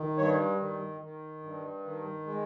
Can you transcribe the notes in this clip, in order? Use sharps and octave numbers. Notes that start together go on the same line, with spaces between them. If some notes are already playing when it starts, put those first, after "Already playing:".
Already playing: D#3
G2 C#5
D#3
D#3
G2
D#3
G#3